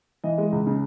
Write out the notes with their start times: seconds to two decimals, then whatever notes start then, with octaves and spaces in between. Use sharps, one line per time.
0.24 E3 D#5
0.38 G#3
0.52 C#2
0.67 C#3